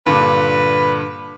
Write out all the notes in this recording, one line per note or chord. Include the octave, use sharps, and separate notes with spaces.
G2 A#2 D3 B4